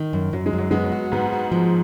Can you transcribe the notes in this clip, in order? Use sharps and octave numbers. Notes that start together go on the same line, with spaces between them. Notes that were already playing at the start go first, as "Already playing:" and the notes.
Already playing: D#3
F#2
F#2 F#3
G#3
F#2
F#3
G#3 B3
F#3
F#4
G#2 B3
F#4
F3